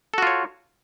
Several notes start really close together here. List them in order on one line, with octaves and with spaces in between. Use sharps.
A4 F#4 F4 C#5